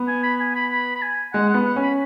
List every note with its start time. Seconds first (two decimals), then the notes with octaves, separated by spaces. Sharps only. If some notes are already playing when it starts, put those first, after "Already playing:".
Already playing: B3
0.08 G#5
0.23 B5
0.40 G#5
0.56 B5
0.72 B5
0.95 B5
1.02 G#5
1.33 G#3 F#5
1.49 F#5
1.54 B3
1.65 F#5
1.76 C#4
1.82 B5